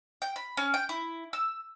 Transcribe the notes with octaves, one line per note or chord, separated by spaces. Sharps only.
G5
B5
C#4
G5
E4
E6